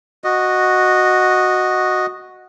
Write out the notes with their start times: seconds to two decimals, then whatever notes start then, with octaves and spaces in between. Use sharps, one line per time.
0.24 F#4 D#5